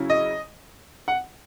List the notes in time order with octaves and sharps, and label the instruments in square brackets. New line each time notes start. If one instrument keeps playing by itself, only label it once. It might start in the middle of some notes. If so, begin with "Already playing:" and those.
Already playing: [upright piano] C#3 F#3 C#4 E4
D#5
F#5